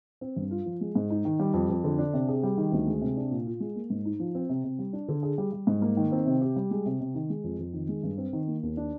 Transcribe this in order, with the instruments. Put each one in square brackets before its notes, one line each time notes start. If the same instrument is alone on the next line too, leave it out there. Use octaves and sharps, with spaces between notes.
[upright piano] C4
G2
F4
F3
G#3
G#2
D#4
D#3
G3
F2
F2
D3
D4
C3
G#4
G3
D#3
D2
G#3
C3
D4
A#2
F4
G#3
A#3
G#2
D#4
F3
C4
C3
C3
G3
D4
D3
G#4
G3
G3
G#2
A#3
D#3
C4
C3
G4
G3
G#3
C3
C3
D#3
G#3
F2
F2
D#3
G#3
G2
C4
D#3
A#3
D#2
D4